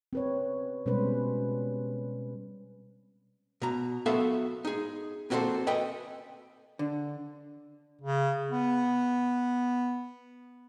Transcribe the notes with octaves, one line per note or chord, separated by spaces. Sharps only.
C4 B4 C#5
B2 G3 G#3 C#4 B4 C5
B2 A#5
B3 F#4 A4 E5 F5
D#4 G#4
A#3 C4 F#4 G#4 A4 C5
A4 B4 D#5 G5 G#5
D3
C#3
B3